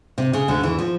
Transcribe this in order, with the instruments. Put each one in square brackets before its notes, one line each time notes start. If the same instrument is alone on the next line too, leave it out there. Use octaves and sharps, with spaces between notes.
[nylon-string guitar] C3
C#3
D2 D3
E2 E3
F3